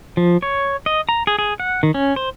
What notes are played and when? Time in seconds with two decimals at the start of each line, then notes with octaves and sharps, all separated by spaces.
0.17 F3
0.42 C#5
0.86 D#5
1.09 A#5
1.27 G#4
1.39 G#4
1.60 F#5
1.83 D#3
1.94 C#4
2.16 C5